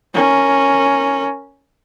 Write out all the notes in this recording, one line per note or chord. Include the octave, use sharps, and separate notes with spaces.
C#4 A#4